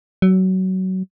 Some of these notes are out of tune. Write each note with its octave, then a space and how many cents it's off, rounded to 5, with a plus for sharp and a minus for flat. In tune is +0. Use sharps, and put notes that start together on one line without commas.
F#3 +20